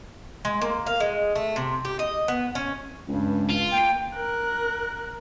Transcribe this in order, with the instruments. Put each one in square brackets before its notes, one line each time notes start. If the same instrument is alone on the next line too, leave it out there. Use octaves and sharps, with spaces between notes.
[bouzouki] G#3
A#3
F5
G#3
A3
C3
G4
D#5
B3
C#4
[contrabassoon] C#2 [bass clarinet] G2
[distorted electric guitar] F4
[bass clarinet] A#3 [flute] G5
[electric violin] A#4 F#6